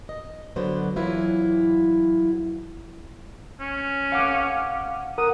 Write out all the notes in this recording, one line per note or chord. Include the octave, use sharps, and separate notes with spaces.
D#5
D3 F#3 B3 C5
E2 E3 F#3 E4 F4
C#4
F5 F#5 D6
A#4 F#5 D#6